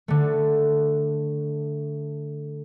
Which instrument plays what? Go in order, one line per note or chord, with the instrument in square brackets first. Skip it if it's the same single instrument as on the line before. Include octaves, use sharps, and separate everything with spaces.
[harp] D3 A3